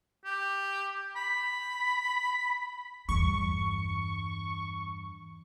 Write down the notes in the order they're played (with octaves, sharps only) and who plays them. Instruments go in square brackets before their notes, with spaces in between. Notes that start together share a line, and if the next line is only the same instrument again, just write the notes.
[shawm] G4
B5
[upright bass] E2 G2 [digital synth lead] C#6